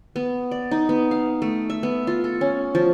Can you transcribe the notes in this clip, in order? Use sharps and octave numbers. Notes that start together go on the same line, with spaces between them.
B3
D5
D#4
B3
F5
A3
E5
B3
F4
A4
C#4
F3